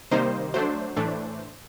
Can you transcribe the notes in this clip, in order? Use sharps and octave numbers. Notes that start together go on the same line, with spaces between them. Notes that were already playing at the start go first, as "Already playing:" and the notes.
C3 D#3 G3 A#3 D#4 C5
F#3 A3 D4 C5
A2 E3 A3 D4